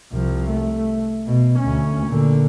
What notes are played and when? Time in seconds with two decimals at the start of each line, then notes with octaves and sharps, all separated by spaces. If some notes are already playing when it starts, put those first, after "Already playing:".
0.12 C2 F3
0.51 A3
1.27 B2
1.59 D2 C#4
2.07 A#2 D3